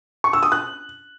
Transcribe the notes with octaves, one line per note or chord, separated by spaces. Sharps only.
C#6
E6
D#6
F#6